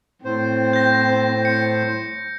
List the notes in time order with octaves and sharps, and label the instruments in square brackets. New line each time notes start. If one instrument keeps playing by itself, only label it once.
[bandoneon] A2 C5 [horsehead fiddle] C4
[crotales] G6 A#6
C#7